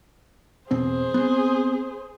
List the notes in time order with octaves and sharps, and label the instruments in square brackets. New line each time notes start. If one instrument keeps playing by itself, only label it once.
[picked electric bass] E2 B2 C4 [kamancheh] G#4 C5
[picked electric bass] B3 C4